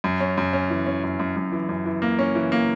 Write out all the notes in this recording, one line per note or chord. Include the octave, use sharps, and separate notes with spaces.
F#2
C#4
F#2
C#4
E3
C#4
F#2
F#2
F#2
E3
F#2
E3
A#3
C#4
E3
A#3